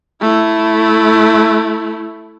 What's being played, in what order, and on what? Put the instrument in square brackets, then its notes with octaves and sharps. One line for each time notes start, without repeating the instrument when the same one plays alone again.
[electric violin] A3 E4